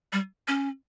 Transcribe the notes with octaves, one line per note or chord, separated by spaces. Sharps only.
G3
C#4